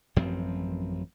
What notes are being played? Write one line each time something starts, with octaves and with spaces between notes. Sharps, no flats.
A1 F#2 F3 C4